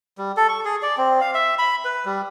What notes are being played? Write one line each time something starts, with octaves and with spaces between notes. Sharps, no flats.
G3
A4
C#6
G#4
D5
C4
F5
E5
B5
B4
G3